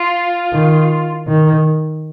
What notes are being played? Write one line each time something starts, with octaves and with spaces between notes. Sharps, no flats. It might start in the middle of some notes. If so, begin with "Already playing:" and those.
Already playing: F4
D#3
D#3